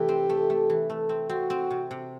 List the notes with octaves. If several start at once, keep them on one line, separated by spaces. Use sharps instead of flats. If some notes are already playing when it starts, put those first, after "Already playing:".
Already playing: C3 E3 A3 G4
C4
A3
A3
E3
A3
C4
C4 F#4
C4
C3
C3